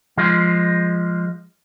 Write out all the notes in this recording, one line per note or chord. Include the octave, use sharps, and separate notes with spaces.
F3 G#3